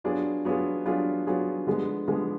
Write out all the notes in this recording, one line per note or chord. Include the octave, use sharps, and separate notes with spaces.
F#3 B3 D4 F4 G#4
F#3 B3 D4 F4 G#4
F#3 B3 D4 F4 G#4
F#3 B3 D4 F4 G#4
D3 F3 G#3 B3
D3 F3 G#3 B3